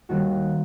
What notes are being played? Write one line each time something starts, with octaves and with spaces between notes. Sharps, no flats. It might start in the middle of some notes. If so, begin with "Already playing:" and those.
D#2 D#3 G3 F#4